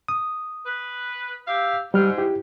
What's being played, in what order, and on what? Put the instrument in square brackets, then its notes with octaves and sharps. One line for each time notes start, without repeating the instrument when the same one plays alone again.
[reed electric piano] D#6
[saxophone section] B4
G4 E5 F5
[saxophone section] G#2 [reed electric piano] G3 G4 F6
[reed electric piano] E4 G4